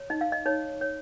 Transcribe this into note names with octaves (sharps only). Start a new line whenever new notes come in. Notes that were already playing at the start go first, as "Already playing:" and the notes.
Already playing: C#5
D#4 D#5
F5
D#5
D#4 C#5
C#5